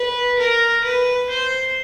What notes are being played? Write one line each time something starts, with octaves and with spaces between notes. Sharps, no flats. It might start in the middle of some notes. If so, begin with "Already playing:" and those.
Already playing: B4
A#4
B4
C5